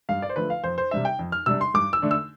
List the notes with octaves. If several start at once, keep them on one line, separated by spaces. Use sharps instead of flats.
G2 F5
D5
C5
D3 F3 A3 B4
F5
F2 C5
C5
C3 G3 D4 E5
G5
F2
F6
C3 G3 D4 E6
C6
G2 D6
E6
D3 A3 D4
E6